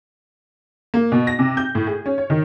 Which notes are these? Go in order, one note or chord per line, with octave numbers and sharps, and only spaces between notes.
A#3
B2
A#6
C3
G6
A2
G#4
C#4
C#5
D#3